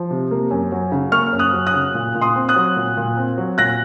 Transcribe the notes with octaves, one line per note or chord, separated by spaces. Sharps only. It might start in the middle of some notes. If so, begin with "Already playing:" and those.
Already playing: F3
C3
A#3
F#2
F#3
C#3
A#3 C#6 F6
F#2
D#6 F#6
F#3
D#6 F#6
C#3
A#2
A#2
C6 D#6
C4
D#6 F#6
F#3
A#2
A#2
C4
F#3
A#2 F#6 A#6